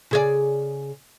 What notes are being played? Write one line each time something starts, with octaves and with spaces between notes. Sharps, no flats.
C#3 G#4 D5